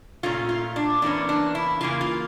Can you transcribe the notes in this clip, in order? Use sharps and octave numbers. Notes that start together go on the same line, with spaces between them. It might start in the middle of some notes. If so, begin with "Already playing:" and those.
A#2 A3 C#4 F4
F4
D4
E2 E3 A#3 C#4 D4
D4
E4
C#3 E3 A#3 F4
F4